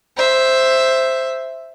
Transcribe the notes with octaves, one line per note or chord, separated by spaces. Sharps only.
C5 E5